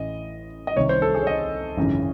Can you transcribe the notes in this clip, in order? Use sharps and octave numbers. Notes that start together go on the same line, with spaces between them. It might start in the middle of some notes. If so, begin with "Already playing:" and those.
Already playing: A1 A2 E3 D#5
D#5
C2 C3 D#3 C#5
C5
A4
G#4
C#5
D#5
G#1 F#2 C#3 E3